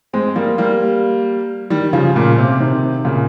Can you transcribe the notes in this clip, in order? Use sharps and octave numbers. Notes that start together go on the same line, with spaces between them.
G#3 C4
G3 A#3
G3 A#3
D#3 G3
C#3 F3
A#2 C#3
C3
C3 D#3
A#2 C#3